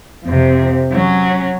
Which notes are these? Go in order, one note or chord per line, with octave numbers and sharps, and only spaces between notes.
F2 C3
F#3 C#4